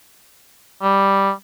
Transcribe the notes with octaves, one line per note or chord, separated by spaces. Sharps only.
G3